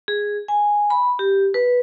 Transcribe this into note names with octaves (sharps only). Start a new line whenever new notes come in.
G#4
G#5
B5
G4
B4